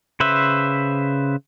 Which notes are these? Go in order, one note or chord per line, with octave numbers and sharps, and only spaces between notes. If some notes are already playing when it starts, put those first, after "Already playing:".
C#3 B4 C5 E5